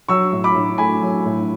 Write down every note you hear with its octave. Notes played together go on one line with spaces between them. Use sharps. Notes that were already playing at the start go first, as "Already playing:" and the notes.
F#3 C#6 E6
A2
B5 D6
A2
A3 G#5 B5
F#3
A2